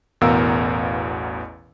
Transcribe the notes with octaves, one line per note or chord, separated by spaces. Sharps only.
A1 E2 B2 A#4 F5 E6